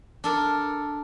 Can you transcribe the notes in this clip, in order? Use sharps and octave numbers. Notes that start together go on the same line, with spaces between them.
D4 A4 A#4